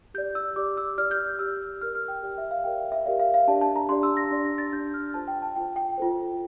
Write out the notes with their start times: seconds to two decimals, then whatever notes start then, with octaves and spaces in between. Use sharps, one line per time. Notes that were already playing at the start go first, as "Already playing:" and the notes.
0.14 G4 D5 G6
0.35 E6
0.56 G4 D5 D6
0.77 E6
0.98 G4 D5 F6
1.11 G6
1.39 G4 D5 E6
1.81 G4 A#4 D5 F6
1.95 F6
2.08 G5
2.22 G4 A#4 D5
2.38 E5
2.51 F5
2.64 G4 A#4 D5 G5
2.78 E5
2.92 E5
3.06 G4 A#4 D5 F5
3.20 F5
3.34 F5
3.48 D4 G4 D5 A5
3.61 A5
3.76 A#5
3.89 D4 G4 D5 C6
4.03 E6
4.17 A#6
4.31 D4 G4 D5
4.45 A#6
4.58 A6
4.72 D4 G4 D5 G6
4.94 F6
5.14 F4 A4 C5 A5
5.28 G5
5.42 A5
5.56 F4 A4 C5 G5
5.76 G5
5.98 F4 A4 C5